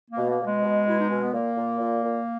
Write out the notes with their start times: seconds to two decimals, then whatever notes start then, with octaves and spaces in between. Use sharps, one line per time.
0.11 A#3
0.17 B2
0.29 A#3
0.40 B2
0.47 G#3
0.63 B2
0.86 B2 E4
0.99 D#4
1.10 B2 C#4
1.22 B3
1.33 A#2 A#3
1.56 A#2
1.79 A#2
2.03 A#2